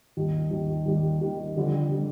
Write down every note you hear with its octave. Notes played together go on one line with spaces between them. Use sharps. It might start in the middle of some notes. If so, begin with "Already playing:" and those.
D#2 D#3 G3
D#2 D#3 G3
D#2 D#3 G3
D#2 D#3 G3
F2 D3 G3
D3 G3